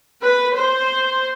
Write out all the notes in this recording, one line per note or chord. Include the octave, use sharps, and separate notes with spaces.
B4
C5